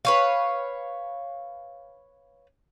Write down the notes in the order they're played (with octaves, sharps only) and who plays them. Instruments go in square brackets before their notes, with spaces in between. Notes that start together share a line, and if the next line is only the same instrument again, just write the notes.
[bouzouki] B4 C#5 F5